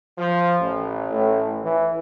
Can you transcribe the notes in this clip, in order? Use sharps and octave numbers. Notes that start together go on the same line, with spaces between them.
F3
A1
A2
E3